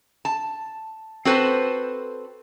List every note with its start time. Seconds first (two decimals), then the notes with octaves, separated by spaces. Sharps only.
0.25 A5
1.25 C4 F#4 A4 B4 C5